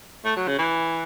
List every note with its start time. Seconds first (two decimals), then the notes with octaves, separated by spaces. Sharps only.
0.25 A3
0.37 F#3
0.48 C#3
0.59 E3